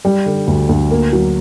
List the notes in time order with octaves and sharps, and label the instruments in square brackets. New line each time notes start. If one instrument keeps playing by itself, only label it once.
[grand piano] G3
D3
D2
D2
A#3
F#3